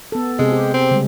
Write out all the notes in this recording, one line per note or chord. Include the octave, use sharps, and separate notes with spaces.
B3 A4
C3 G#3 C4 G#4
G4
C4
C#3 G3 G#3